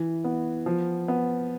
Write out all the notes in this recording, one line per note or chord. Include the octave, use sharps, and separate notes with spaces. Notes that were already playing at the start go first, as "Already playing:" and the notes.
Already playing: E3
B3
F3
B3